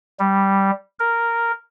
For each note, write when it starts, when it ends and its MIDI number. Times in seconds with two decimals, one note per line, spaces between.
0.19 0.71 55
0.99 1.52 70